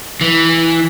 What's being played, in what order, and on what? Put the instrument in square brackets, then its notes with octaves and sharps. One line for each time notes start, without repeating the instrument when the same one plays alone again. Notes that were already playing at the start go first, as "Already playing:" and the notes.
[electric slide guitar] E3